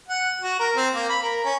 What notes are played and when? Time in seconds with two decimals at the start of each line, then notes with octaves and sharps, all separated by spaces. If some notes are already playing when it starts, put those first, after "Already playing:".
0.08 F#5
0.41 F#4
0.59 A#4
0.76 C4
0.95 A#3
1.09 B5
1.22 A#4
1.45 C#4